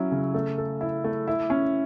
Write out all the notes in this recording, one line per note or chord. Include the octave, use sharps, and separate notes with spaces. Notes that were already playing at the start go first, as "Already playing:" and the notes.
Already playing: F#3 C#4 E4
C#3
A3
A4
E4
A3
E4
C#4